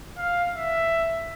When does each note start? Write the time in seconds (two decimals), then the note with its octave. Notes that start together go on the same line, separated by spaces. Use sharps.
0.18 F5
0.54 E5